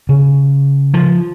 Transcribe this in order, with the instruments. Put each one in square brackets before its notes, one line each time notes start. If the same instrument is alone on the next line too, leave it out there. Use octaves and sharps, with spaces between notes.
[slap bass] C#3
F3